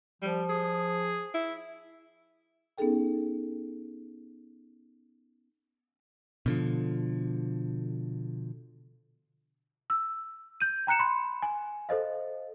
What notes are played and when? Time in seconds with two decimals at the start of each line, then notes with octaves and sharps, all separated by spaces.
0.22 F3 G3
0.49 G#4
1.34 E4
2.78 B3 C#4 D#4 G#4 A4 G5
6.46 B2 D3 F3
9.90 E6
10.60 G6 D#7
10.87 G5 A#5 F#6 C#7 E7
10.99 B5 C6
11.42 G#5
11.89 A4 C5 D#5 F5